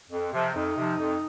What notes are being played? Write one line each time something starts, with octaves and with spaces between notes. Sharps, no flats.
F2
C3 F3
F2 D#4
C3 F3
F2